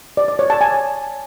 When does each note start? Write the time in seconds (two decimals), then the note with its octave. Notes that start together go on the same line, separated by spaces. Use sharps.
0.17 D5
0.28 D5
0.39 C#5
0.50 A5
0.61 G#5